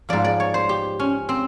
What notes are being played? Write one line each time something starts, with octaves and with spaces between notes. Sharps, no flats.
G#2 F3 D5
D5
C#5
C5
G4
C#4
C4